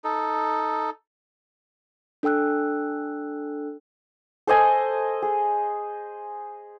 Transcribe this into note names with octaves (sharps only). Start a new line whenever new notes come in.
D#4 A4
D4 A4 G5 E6 F#6
A4 C5 D#5 G#5
G#4